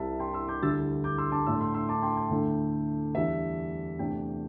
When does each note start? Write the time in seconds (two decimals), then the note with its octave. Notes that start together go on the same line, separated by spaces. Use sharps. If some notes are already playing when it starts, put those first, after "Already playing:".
Already playing: C2 C3 G3 E4 E5 A5
0.20 G5 C6
0.34 C6 E6
0.48 D6 G6
0.62 D2 D3 G3 E4 E6 A6
1.04 D6 G6
1.18 C6 E6
1.32 A5 D6
1.46 A2 A3 D4 C6 E6
1.61 C6 E6
1.74 C6 E6
1.89 A5 D6
2.02 G5 C6
2.17 G5
2.30 D2 D3 A3 E4
3.15 E2 E3 G3 D4 E5
3.99 E2 C3 A3 D4 G5